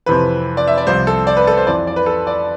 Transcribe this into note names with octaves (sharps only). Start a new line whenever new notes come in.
F2 C3 E3 B4
D5
E5
D5
C2 C3 F3 C5
A4
D5
B4
A4
C5
F2 E3 D5
D5
B4
A4
D5